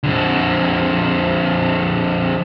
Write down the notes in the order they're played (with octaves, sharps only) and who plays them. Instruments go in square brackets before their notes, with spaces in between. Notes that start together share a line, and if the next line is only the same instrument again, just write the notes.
[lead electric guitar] F2 D3